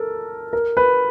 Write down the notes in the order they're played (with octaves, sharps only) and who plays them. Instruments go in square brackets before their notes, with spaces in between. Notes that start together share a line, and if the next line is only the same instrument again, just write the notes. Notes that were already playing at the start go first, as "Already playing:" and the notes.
Already playing: [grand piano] A4 A#4
A#4
B4